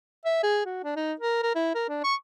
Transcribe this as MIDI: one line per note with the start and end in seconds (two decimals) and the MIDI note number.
0.25 0.39 76
0.43 0.61 68
0.65 0.83 66
0.84 0.94 62
0.96 1.13 63
1.20 1.38 70
1.43 1.53 70
1.55 1.74 64
1.75 1.88 70
1.89 2.00 62
2.04 2.14 85